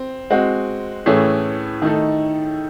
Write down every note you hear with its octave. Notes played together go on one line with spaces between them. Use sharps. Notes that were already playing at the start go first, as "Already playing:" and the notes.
Already playing: C4
G#3 C4 F#4
A2 E3 A3 C#4 G#4
D#3 A3 D#4 A4